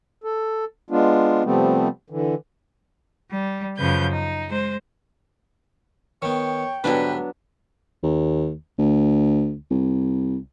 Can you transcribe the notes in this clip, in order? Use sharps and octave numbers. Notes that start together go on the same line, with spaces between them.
A4
G#3 B3 D4 F4
C3 F3 G3 A3 B3 C4
D3 E3
G3
F#2 C#3 F3 B4 G6
D#4
G#3 C5
D#3 B3 C#5 G5
G#2 D3 F#3 G3 B3 D4 B4
D#2
D2
C2